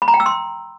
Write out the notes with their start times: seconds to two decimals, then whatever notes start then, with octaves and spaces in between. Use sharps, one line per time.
0.02 B5
0.08 A#5
0.14 G5
0.20 E6
0.26 C6